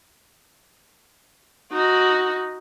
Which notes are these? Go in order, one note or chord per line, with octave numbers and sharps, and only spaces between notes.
D#4 F#4